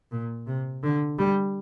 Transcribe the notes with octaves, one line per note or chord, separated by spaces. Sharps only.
A#2
C3
D3
G3